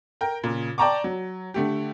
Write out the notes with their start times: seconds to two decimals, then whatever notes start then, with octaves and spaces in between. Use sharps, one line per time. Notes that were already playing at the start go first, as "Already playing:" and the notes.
0.21 A#4 G5
0.44 A#2 C#3
0.78 D5 G5 A5 A#5 C#6 D6
1.04 F#3
1.54 D3 A3 G4